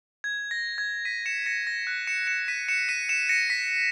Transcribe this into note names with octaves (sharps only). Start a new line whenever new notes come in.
G#6
A#6
G#6
B6 D#7
C#7 E7
A#6 C#7
A#6
F#6
C#7 E7
C#7 E7
B6 D#7
C#7 E7
B6 D#7
C#7 E7
A#6 C#7
B6